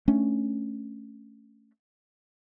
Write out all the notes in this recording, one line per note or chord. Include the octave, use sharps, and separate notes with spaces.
A3 C#4 D4